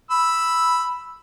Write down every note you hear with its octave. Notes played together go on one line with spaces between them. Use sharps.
B5 E6